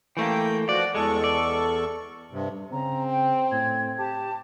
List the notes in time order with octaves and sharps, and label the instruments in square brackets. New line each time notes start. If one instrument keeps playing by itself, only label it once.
[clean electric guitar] E3 A3 A#3 [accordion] G5
[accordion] F3 F#4 [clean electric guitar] D5
[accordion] E2 A4 C#6 [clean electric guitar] G#3
[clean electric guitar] D5
[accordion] G2 C3
[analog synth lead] C#3 [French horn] C4 [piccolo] A#5
[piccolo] G5
[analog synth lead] A2 [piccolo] G#6
[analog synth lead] G4 [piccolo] A5